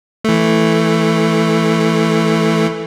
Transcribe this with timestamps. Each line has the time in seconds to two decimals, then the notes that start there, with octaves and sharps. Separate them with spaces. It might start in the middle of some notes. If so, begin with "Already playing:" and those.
0.24 E3 A3